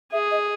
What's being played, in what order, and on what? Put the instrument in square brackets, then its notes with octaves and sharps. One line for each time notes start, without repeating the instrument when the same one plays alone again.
[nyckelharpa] G#4 [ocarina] E5
[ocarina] D#5